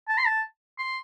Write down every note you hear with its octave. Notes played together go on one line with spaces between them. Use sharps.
A5
C6
A5
C6